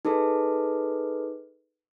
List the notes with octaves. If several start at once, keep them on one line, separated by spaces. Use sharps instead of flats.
D#4 G#4 A4 B4